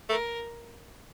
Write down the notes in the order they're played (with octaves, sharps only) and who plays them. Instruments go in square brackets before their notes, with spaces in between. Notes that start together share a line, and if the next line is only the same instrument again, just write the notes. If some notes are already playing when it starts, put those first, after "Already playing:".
[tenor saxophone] A3 [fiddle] A#4